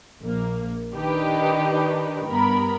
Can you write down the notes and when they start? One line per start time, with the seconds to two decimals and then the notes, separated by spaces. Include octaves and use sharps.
0.21 A#1 A#3
0.93 D#3 D4 D#4 G4 B4
2.27 G2 B3 A#4 B5